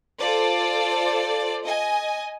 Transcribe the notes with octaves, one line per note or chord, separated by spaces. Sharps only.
F4 A4 C5 D5
D#5 G#5